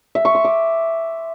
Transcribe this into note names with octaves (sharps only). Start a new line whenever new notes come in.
E5
C#6
C6
D6